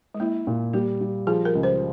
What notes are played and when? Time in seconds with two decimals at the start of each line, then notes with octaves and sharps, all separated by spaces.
0.15 G#3
0.20 A#3 E4
0.47 A#2
0.73 G3 A#3
1.01 G3
1.27 F3 G#4
1.45 A#4
1.55 C#2
1.63 C5